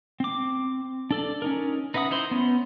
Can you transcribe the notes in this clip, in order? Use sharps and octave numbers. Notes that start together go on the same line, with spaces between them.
C4 D6
D4 A4 D5
C#4 D#4 A#4
D#4 B4 E5 F#5 D#6
D#4 E4 C5 C6
B3 C#4